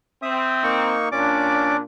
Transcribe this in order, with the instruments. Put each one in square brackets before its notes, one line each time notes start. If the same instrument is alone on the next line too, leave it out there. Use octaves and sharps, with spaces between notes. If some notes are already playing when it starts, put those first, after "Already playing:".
[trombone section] C4 [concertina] E5 D#6
[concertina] A#3 D#4 C#6
[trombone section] A#2 [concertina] C#4 D5 D6 [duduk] D4